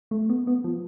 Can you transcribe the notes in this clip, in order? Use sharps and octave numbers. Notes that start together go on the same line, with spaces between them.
A3
B3
B3
F3